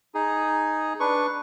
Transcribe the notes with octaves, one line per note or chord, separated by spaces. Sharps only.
D#4 G#4
D4 B4 C#6